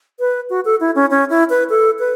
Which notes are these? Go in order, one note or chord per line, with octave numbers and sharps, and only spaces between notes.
B4
F#4
A4
E4
C#4
C#4
E4
B4
A4
B4